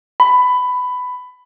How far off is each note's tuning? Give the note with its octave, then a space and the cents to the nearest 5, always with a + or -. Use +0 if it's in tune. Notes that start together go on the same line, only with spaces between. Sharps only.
B5 +15